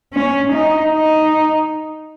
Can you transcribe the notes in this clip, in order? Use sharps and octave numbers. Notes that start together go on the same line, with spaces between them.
C#4
D#4
D#4